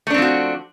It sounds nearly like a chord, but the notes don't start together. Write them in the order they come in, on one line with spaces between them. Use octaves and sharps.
A3 D4 C4 F3 F#4